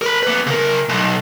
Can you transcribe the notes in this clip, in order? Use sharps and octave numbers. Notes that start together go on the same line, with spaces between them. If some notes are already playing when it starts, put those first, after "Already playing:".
A#4 B5
A#3 B4
C#3 A#4
B1